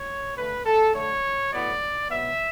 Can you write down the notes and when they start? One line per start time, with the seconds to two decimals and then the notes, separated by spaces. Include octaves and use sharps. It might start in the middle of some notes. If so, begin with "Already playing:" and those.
Already playing: C#5
0.36 D3 A3 B4
0.65 A4
0.94 D3 A3 C#5
1.52 A2 F#3 B3 D5
2.09 B2 F#3 B3 E5